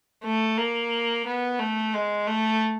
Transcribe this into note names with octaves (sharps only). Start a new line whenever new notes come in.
A3
A#3
B3
A3
G#3
A3